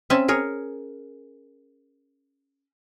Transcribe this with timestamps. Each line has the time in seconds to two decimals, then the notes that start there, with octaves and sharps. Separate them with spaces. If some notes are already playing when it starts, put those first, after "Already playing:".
0.10 C4 C#4 E5 G#5 A5
0.28 G#4 A#4 C#5